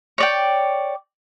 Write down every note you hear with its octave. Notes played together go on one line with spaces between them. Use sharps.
C#5 D5 G5